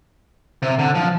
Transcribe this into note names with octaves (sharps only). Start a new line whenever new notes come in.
C3
D3
F3